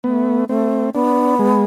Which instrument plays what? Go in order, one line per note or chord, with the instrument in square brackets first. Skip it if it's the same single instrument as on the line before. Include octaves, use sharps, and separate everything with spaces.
[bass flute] A3 [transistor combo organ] B3
[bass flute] A3 [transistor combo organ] C4
[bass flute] B3 [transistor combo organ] D4
[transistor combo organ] G#3